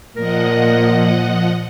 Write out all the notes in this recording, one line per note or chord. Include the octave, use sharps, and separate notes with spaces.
A#2 F3 A#4 D#5 F#5